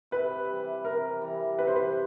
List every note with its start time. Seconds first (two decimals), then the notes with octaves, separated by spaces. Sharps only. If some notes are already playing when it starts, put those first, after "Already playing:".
0.11 C3 B4
0.49 E3 G3
0.85 C3 A#4
1.22 E3 G3
1.59 C3 B4
1.67 C5
1.76 B4